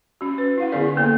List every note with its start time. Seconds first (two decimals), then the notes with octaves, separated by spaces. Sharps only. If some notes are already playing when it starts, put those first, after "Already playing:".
0.21 C#4 F#4
0.38 B4
0.58 E4 F5 F#5
0.72 D3 B3 E4 G#4 A#4 D5
0.97 A#3 B3 A4